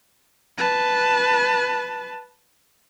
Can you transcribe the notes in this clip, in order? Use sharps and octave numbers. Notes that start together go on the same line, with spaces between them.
B4 A5